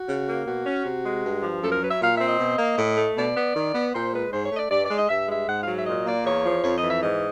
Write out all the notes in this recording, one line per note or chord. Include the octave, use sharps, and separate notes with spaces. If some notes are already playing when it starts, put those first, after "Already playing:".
Already playing: F#4
C#3
A#3
B2 F#4
C#4
C3
G#3
G2
F3
F#2 A4
A#4
F#3 B4
E5
A#2 F5
E5
C4
D#5
B2
A#3
A2
A3
B2 D5
B3
D#3
B3
A#2 C5
G#3 B4
G#2 C5
C#5
A3 D#5
D5
G2 D5
D5
G#3
D#5
G2 E5
G#3 E5
G#2 F#5
F5
F#3
E5
A#2 D#5
A#3 D5
E2 C#5
F3
F2 C#5
D#5
E3
E5
G#2 D#5